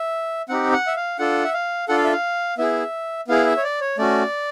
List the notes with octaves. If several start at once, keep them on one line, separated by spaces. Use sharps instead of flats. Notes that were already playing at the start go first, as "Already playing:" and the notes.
Already playing: E5
C4 D#4 G4 F#5
F#5
E5
F5
D4 F4 A4 F#5
E5
F5
D4 F4 A4 F#5
F5
E5
F5
B3 E4 G#4 E5
B3 E4 G#4 F5
E5
C#5
D5
C#5
A3 C#4 F#4 D5